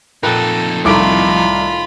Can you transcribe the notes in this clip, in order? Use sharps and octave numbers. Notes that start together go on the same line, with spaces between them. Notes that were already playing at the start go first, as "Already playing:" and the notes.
F2 A#2 D#4 A4 B4 G5
C2 A2 D#3 A3 F4 B5 D6 D7